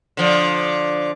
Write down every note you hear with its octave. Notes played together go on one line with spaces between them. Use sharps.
D3 F3